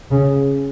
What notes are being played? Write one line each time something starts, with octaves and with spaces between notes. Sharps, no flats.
C#3